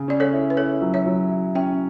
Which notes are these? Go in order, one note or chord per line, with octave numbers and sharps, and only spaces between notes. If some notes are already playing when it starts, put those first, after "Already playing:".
Already playing: C#3
C#4 D5
A4 C#5
E4
B4
E4 A4 C#5
F#3
C#5 E5
F#3
E4
C#4 E5 G5